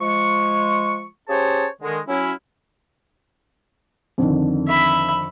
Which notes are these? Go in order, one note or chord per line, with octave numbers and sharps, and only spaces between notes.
F3 G#3 C#6
C#4 G4 G#4 C5 C#5 A5
D3 D#3 G#3
F#3 C#4 E4
F2 D3 D#3
E5 B5